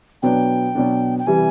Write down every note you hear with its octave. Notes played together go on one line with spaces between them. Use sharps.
B2 F#3 B3 D4 G5
B2 F#3 B3 D4
G5
C3 E3 G3 G#5